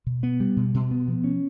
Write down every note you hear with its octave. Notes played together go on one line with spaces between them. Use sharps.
B2
B3
G3
B2
B2
B3
F3
C#4